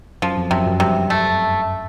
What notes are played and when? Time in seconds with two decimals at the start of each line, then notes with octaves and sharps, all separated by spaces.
0.22 F#2 F3
0.37 F2
0.51 F#2 C3
0.66 F#2
0.80 G2 C3
1.10 A3